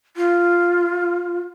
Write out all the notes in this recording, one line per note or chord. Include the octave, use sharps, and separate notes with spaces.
F4